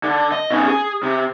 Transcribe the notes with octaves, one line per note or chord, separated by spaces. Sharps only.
D3
D#5
B2 C#4
G#4
C3